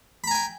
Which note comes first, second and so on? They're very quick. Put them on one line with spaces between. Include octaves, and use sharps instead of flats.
B5 A#5 G#5 G5